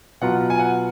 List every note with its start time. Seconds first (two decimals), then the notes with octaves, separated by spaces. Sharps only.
0.21 B2 F#3 B3 F4 F#5
0.50 G#5
0.59 F#5